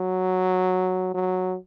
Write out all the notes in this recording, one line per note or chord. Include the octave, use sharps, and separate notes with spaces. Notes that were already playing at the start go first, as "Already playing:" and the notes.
Already playing: F#3
F#3